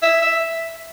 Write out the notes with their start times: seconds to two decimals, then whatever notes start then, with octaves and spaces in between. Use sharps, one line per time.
0.03 E5
0.22 E5